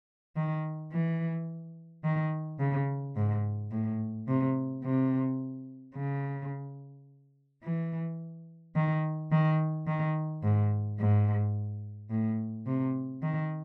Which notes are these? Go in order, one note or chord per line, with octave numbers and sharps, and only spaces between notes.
D#3
E3
D#3
C#3
G#2
A2
C3
C3
C#3
E3
D#3
D#3
D#3
G#2
G#2
A2
C3
D#3